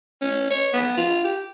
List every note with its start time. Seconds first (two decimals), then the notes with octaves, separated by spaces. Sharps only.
0.21 C#4
0.50 C#5
0.73 B3
0.97 F4
1.24 G4